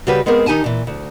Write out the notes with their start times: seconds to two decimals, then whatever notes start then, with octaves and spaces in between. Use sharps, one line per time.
0.07 C#3 G3 F#4 G4 B4
0.26 G#3 B3 C4 G#4 A#4
0.46 D#3 D#4 G4 G#5 A5
0.64 A#2 E3
0.87 D2